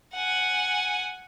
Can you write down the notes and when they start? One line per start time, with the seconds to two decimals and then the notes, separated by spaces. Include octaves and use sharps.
0.14 F#5 G#5